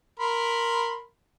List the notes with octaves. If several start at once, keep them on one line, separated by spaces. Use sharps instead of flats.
A#4 B5 C6